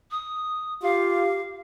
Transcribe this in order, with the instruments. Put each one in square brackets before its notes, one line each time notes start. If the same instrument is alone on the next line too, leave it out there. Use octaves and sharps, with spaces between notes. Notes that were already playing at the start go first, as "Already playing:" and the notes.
[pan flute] D#6
[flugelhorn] F4 [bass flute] G4 [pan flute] F5